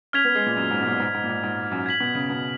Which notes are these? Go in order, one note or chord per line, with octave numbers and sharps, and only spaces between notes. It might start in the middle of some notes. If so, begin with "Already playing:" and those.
C#4 F6 G#6 B6 F7
B3
G#3
A#2
F#2
G#2
B2
A#2
G#2
G#2
A#2
G#2
G#2
F#2
G#6 B6 F#7
B2
C#3
B2